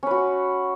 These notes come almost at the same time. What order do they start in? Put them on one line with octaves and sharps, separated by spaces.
C#4 B4 F#4